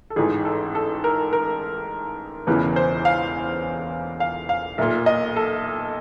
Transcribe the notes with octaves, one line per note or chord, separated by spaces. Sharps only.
A4
A1 G#2 E3 G#4
A4
A4
A#4
A#4
E1 E2 C#3 E3 B4
C5
F5
F5
F5
B1 A#2 E5
D#5
A4